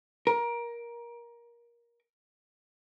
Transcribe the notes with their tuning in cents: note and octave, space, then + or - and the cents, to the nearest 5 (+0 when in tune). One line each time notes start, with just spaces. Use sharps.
A#4 +20